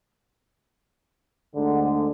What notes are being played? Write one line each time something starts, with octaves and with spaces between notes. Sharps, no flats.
D2 G#2 D3